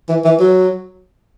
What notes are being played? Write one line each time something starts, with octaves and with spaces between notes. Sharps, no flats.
E3
E3
F#3